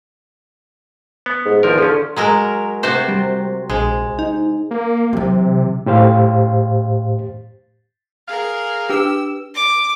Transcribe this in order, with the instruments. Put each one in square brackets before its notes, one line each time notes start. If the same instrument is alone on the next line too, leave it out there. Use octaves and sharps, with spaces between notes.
[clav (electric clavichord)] B3
[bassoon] G#2
[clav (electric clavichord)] G#1 F3 A#4 [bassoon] E2
[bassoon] D3 [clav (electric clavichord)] F3 C#4
[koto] F#3 G#3 A#4
C3 F#4 C5
[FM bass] G3
[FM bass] A#1 [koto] G#3
[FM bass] D#4
[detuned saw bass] A#3
[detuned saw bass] C3 [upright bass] E3 F#3
[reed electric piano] A2 G4 C5 F5
[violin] G#4 A#4 [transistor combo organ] F5
[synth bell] D4 B4 [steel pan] G4 [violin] E6
[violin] D6